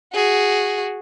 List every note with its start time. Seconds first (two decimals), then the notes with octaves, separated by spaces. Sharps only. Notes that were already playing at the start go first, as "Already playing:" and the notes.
0.13 F#4 G#4